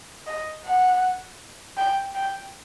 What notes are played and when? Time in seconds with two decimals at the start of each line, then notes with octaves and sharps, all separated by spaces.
0.27 D#5
0.65 F#5
1.77 G5
2.15 G5